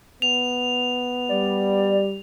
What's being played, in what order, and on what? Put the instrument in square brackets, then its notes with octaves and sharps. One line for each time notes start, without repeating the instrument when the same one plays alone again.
[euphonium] B3 [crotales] F7
[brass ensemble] G3 [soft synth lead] D5